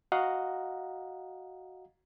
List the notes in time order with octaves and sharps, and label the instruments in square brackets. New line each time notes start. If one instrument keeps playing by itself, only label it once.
[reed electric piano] F#4 D#5 F5 F#5 A#5